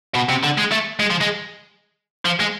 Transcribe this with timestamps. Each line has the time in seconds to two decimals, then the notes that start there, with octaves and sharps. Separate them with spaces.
0.15 B2
0.30 C3
0.44 D3
0.58 G#3
0.72 A3
1.00 G#3
1.11 F3
1.21 G#3
2.25 F3
2.40 G#3